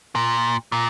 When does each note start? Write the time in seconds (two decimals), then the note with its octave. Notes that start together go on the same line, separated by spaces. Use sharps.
0.15 A#2
0.72 A#2